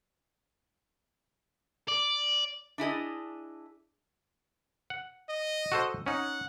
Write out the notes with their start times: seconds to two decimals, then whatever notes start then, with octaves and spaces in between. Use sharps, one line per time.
1.88 D5
2.78 D4 E4 G#4 D#5
4.90 F#5
5.29 D#5
5.72 F#4 A4 C5
6.06 C#4 D#4 F#5